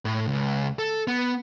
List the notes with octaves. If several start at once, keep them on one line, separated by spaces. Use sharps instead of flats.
A2
C#2
A4
B3